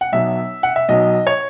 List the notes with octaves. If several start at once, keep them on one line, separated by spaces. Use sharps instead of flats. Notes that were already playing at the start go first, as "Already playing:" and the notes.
F#5
B1 B2 F#3 E5
F#5
E5
B1 B2 F#3 D#5
C#5